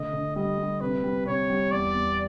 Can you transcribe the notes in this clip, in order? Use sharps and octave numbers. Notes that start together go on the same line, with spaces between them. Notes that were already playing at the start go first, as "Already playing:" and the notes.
Already playing: D3 A3 D#5
D3
G3 D#5
G3
C3 B4
G3
C3 C#5
G3
E2 D5
E2